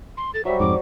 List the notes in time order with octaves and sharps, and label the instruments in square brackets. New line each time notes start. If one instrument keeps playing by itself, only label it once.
[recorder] C6
[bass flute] A4 [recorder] A6
[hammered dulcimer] F#3 G3 [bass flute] C5 [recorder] E5
[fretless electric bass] F2 G#2 [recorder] D6